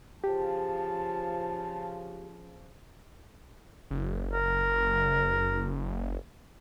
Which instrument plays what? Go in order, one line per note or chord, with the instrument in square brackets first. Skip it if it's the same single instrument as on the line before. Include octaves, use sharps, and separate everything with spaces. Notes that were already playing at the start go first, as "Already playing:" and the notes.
[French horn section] C#3 F3 [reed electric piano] G4 [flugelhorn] A5
[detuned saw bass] F#1
[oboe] A#4